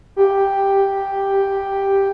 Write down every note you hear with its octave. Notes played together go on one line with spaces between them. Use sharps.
G4